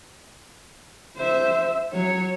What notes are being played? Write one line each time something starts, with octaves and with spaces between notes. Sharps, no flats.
C5 E5
F#3 C#5